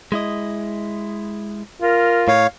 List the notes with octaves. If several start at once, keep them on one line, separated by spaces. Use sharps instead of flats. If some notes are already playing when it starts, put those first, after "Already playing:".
G#3 E4 D#5
F4 A#4
A2 C#5 F5